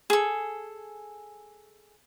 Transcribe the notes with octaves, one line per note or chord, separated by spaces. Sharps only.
G#4 A4